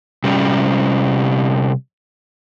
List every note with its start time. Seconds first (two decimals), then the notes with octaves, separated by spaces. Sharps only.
0.24 C3 G3 C#4